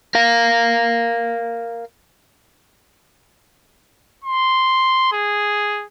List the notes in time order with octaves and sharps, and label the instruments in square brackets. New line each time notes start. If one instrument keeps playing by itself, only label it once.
[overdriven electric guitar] A#4 F5
[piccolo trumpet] C6
G#4